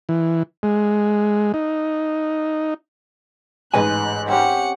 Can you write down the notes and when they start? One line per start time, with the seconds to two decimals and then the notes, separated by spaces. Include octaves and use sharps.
0.09 E3
0.63 G#3
1.54 D#4
3.74 A1 G#2 G#3 B4 D#5 G#5 F#6
4.29 C4 C#4 G4 F#5 C#7